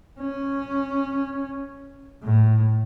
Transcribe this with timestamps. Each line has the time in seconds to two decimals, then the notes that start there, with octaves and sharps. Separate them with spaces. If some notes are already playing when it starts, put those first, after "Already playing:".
0.20 C#4
2.23 A2